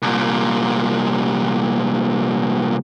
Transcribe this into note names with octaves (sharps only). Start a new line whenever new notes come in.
C2 A#2